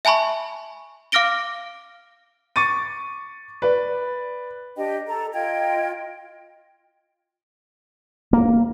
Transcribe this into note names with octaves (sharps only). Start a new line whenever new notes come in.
E5 G#5 A5 B5 C#6
F5 D6 F6 A#6 D7 G7
C#6 D6 A6 D#7
B4 D5
D4 G4 D#5 G5
A4 A#5
F4 D#5 G5 G#6
A#3